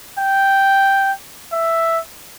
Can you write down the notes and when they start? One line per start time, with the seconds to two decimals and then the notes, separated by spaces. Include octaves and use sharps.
0.18 G5
1.52 E5